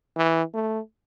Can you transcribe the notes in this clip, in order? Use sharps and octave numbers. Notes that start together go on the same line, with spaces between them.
E3
A3